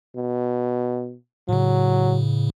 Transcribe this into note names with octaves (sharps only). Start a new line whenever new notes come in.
B2
A2 C#3 F#3